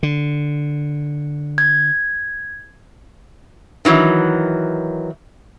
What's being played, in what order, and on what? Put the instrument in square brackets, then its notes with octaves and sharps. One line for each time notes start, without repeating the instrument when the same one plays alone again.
[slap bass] D3
[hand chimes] G#6
[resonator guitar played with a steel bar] D#3 E3 F#3